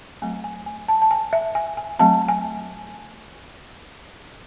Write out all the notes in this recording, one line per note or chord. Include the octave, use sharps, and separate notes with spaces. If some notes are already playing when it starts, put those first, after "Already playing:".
F#3 A3 C4 G#5
G#5
G#5
A5
A5
G#5
E5
G#5
G#5
F#3 A3 C4 A5
G#5